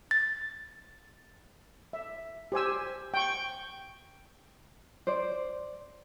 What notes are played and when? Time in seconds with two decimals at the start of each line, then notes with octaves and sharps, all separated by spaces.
0.11 A6
1.93 E5
2.52 G4 C5 G#5 E6
3.14 G5 C#6
5.07 C5 D5